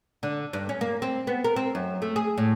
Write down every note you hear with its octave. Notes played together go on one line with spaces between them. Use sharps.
D3
G2
C#4
A#3
C4
B3
A#4
C4
F#2
A3
G#4
A2